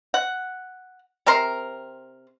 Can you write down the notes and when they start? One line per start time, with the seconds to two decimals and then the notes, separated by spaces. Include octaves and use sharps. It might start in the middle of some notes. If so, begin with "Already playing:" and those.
0.14 F#5
1.26 C3 C4 A#4 C6